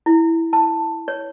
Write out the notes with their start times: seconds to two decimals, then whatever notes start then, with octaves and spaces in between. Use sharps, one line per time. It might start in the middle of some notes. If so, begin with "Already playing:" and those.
0.06 E4
0.53 A5
1.08 C#5